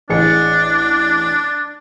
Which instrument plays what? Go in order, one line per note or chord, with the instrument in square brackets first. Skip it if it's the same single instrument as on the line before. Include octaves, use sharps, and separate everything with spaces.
[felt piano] A1 G#4 C#7 [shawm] D4